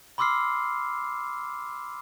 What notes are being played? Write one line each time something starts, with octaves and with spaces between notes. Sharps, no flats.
B5 C6 D6 E6 F6 C7